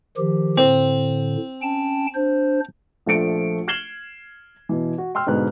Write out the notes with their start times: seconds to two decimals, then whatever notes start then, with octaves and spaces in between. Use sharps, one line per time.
0.17 D#3 F3 G4
0.58 A2 D3 C4
1.62 C#4 G5 A5
2.15 D4 C5
3.06 A#1 F3 A3 C#7 D7
3.68 F6 G#6 C7 E7 F#7 G7
4.69 B2 E3
4.98 F#4
5.15 G5 C6 E6 F6
5.27 G#2 B2 D3 B4 F#6